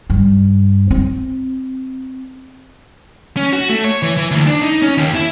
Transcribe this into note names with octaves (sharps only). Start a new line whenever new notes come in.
G2
C4
C#4
F#4
A3
C#5
E3
E3
D2
D4
D#4
C#4
D#2
E4